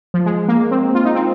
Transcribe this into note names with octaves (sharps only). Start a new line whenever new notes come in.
F3
G#3
A#3
C4
F4
D#4
C4